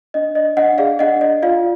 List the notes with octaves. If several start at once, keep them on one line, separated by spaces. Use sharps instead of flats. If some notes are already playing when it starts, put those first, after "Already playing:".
D4 D#5
D5 D#5
D4 D#5 F#5
G#4 D5 F5
D4 D#5 F#5
D5 D#5
F4 D5 F5